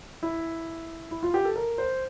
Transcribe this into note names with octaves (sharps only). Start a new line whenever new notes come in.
E4
E4
F4
G4
A4
A#4
C5